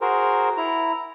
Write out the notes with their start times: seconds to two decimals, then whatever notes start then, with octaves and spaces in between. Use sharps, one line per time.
0.01 F#4 G#4 A#4 C5
0.57 E4 A#5